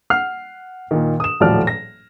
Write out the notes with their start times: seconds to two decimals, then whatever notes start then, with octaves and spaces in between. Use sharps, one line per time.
0.10 F#5 F6 C7
0.91 A#2 D#3
1.20 D#6 E7
1.40 D#1 A2 F3 F#3 D5 F6
1.67 A#6